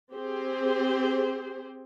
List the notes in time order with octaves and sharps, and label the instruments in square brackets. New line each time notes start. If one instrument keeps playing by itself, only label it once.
[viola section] C4 G4 G#4 C5